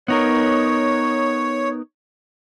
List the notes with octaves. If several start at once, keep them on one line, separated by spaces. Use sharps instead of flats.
B3 D#4 A#4 C#5